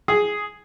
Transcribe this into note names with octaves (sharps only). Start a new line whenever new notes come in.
G#4